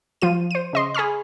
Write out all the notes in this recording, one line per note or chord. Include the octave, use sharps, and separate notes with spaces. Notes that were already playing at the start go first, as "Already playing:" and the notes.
F3 F4 D#7
C5 D#7
C#3 D#5 C6
G#4 G#5 B5 C#6 F6